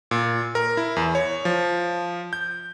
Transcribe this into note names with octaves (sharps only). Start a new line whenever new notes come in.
A#2
A#4
E4
E2
C#5
F3
G6